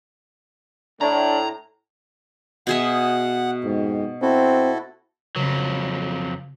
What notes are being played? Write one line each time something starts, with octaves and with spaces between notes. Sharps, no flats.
A2 D4 A#5
B2 G#4 E5 F#5
F2 G#2
C4 E4 F#4 A4
F2 C#3 F#3